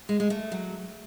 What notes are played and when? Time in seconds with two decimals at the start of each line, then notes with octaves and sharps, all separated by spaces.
0.09 G#3
0.20 G#3
0.30 A3
0.52 F#3